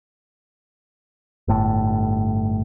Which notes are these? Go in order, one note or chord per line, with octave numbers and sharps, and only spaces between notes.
G1 A2